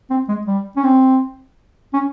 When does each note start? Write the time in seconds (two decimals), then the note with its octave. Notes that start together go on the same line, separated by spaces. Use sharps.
0.10 C4
0.29 G#3
0.47 G3
0.76 C#4
0.84 C4
1.94 C#4